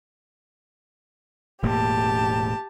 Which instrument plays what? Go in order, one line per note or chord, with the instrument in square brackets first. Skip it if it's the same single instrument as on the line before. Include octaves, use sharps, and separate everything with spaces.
[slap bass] E1 A2 A#3 [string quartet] G4 A5